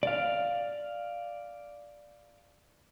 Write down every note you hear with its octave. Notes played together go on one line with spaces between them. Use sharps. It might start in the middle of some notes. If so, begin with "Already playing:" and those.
D5 F5